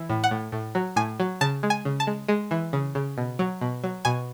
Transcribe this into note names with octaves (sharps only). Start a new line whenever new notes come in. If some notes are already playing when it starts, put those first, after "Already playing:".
Already playing: E3
A2
F#5
A2
A2
F#3
A2 G#5
F#3
C#3 A5
G#3
G#5
C#3
A5
G#3
G#3
E3
C#3
C#3
B2
F#3
B2
F#3
B2 G#5